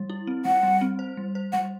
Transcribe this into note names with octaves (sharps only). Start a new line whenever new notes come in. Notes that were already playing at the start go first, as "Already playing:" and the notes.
Already playing: G3
E4
C4
G3 F#5
G3
C4
C5
G3
C5
G3 F#5